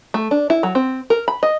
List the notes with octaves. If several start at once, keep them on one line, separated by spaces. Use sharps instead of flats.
A3
D4
E4
F#3
C4
A#4
B5
D#5